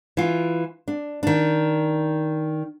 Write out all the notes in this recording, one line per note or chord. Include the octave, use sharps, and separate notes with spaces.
E3 F4
D4
D#3 D4